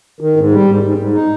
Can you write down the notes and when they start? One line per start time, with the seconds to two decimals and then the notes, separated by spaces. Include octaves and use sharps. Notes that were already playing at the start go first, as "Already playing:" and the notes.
0.20 D#3
0.36 G#2
0.51 G3
0.66 G#2
0.83 G#2
0.98 G#2
1.14 D#4